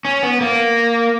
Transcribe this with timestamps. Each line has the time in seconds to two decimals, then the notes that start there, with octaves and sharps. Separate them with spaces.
0.05 C#4
0.23 B3
0.41 A#3